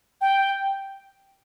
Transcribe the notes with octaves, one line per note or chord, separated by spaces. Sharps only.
G5